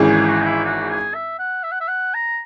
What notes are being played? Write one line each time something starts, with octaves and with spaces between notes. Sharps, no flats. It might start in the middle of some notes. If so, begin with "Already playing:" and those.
Already playing: G#1 G#2 E3 G#3 C#4
G#4
F#4
D#4
E4
F#4
G#4
E5
F#5
E5
F#5
E5
F#5
A#5